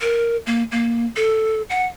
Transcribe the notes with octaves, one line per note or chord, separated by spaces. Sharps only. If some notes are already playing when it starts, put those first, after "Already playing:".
A#4
A#3
A#3
A4
F#5